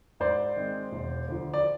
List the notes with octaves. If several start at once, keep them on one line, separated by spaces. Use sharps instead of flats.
G#2 C5 D5
D#3 G#3 C4
E1
D2 D3 F3
D5